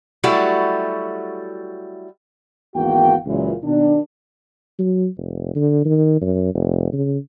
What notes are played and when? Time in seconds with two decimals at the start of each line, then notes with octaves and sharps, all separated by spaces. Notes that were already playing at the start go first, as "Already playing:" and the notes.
0.23 F#3 G3 A3 E4 F#4
2.75 G#1 E2 A#3 F#4 F5 G5
3.26 C#2 F#2 A#2 E3
3.63 B2 D#3 D4
4.79 F#3
5.17 F1
5.55 D3
5.85 D#3
6.21 F#2
6.54 F1
6.93 C#3